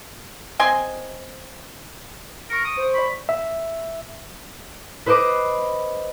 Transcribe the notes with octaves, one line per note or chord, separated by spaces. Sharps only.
C4 D#5 G#5 C6
A#4 C#6 C#7 D7
D#6
C5
D5 B5 C#6
E5
B4 C5 D#5 B5 D6